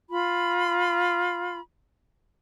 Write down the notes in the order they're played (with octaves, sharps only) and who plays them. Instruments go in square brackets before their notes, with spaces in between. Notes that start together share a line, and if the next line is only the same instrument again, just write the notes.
[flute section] F4 B5